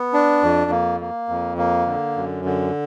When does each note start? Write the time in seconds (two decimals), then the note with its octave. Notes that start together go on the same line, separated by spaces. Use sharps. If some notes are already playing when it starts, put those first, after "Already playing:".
Already playing: B3
0.13 D4
0.43 F2
0.71 A#3
1.00 A#3
1.29 F2
1.58 A#3
1.87 D3
2.16 F#2
2.45 D3